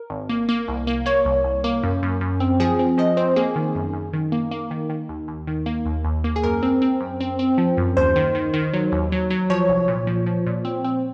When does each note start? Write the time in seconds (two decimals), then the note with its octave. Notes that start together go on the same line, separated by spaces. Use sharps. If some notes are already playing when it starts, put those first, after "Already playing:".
Already playing: A#4
0.10 G#1
0.29 A#3
0.49 A#3
0.68 C2
0.87 A#3
1.06 A#3 C#5
1.25 C2
1.44 C2
1.64 A#3
1.83 F#2
2.03 F#2
2.21 F#2
2.40 C4
2.60 F3 G#4
2.79 C4
2.98 F3 D#5
3.17 C4 C5
3.36 A#3 G#4
3.56 D#3
3.75 F#2
3.93 F#2
4.13 D#3
4.32 A#3
4.51 A#3
4.71 D#3
4.89 D#3
5.09 D#2
5.28 D#2
5.47 D#3
5.66 A#3
5.86 D#2
6.05 D#2
6.24 A#3
6.36 G#4
6.43 F#2 A#4
6.63 C4
6.82 C4
7.00 F#2
7.20 C4
7.39 C4
7.58 F3
7.77 F#2
7.97 D#2 C5
8.16 D#3
8.35 D#3
8.54 D#3
8.74 F#3
8.92 D#2
9.12 F#3
9.30 F#3
9.50 F3 C#5
9.69 C2
9.88 A#2
10.07 F3
10.26 F3
10.46 A#2
10.65 C4
10.85 C4